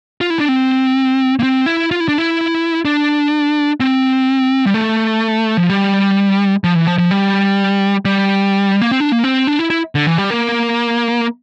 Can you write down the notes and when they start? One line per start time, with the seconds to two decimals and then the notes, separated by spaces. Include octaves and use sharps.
0.21 F4
0.30 E4
0.39 D4
0.48 C4
1.39 A#3
1.43 C4
1.66 E4
1.91 F4
2.00 E4
2.08 D4
2.18 E4
2.85 D4
3.80 C4
4.66 G3
4.74 A3
5.57 F3
5.69 G3
6.64 F3
6.75 E3
6.87 F3
6.98 F3
7.11 G3
8.05 G3
8.82 A#3
8.91 C4
9.00 D4
9.12 A#3
9.24 C4
9.47 D4
9.59 E4
9.70 E4
9.95 D3
10.06 E3
10.18 G3
10.30 A#3